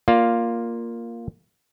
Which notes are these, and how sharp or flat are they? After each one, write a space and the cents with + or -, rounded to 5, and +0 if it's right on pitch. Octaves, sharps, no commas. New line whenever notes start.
A#3 +0 F4 +0 D5 +0